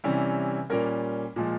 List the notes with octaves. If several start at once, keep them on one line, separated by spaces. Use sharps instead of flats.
C3 E3 G3 C#4
A#2 G3 A#3 C#4 A#4
A#2 F3 G#3